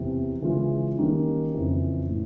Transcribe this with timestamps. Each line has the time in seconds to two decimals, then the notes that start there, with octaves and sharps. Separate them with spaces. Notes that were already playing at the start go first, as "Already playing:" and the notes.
Already playing: E2 C3 E3
0.42 C#3 E3 G#3 C#4 F4
0.99 D#3 G3 A#3 C#4
1.54 F2 C#3 E3
2.10 A2